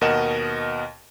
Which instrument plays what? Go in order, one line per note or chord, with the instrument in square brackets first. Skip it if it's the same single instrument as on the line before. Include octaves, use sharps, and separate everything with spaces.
[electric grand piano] D#2 B2 A#4 D#5 F#5 E7